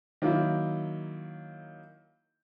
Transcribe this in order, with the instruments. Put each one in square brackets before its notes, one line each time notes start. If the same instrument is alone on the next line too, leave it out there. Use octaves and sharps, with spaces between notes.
[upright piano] D#3 F#3 A#3 E4